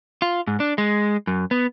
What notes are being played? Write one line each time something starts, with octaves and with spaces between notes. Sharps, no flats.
F4
G#2
D4
G#3
F#2
B3